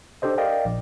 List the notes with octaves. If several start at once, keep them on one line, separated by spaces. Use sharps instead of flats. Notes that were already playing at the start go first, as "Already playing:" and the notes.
D4 G4 A4 C5 D#5
A#4 D5 D#5 F5 G5
A#1